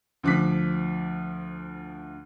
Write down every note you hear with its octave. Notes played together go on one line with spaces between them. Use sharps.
D2 F3 D6 F#6 B6